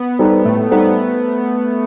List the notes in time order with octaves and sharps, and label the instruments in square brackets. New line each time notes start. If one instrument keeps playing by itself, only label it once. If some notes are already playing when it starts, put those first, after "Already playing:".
Already playing: [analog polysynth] B3
[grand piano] G3 D#4 A4 C5
[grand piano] A2 [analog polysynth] A3
[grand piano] G3 D#4 A4 C5 [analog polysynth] B3